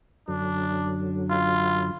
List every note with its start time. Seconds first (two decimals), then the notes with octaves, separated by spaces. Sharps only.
0.28 F#2 D3 F#3 D4
1.30 F4